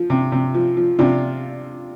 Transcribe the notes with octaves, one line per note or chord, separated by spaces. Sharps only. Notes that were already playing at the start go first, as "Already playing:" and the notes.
Already playing: F3
C3
C3
F3
F3
C3 D4 F4